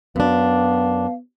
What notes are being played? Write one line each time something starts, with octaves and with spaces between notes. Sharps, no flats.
F#2 B3 D4 F5